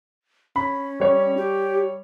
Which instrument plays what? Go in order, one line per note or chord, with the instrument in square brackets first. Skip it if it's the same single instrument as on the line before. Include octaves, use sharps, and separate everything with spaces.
[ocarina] C#4 [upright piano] B5
[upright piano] G3 C#5
[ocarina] G4